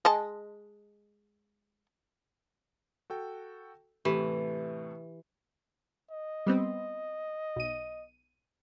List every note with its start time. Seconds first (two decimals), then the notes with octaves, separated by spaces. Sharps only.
0.05 G#3 D#5 A5
3.10 F#4 A4 G5
4.05 A2 C3 E3 A3 G4
6.11 D#5
6.46 G3 B3 C4
7.56 B1 D#7